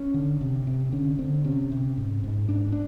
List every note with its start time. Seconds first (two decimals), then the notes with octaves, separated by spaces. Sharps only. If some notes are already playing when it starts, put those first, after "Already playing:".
Already playing: C#4
0.14 D3
0.41 C3
0.67 C3
0.92 D3 C#4
1.19 D3 C4
1.44 C3 C#4
1.72 C3
1.97 G#2
2.24 G#2
2.49 G#2 D4
2.72 D4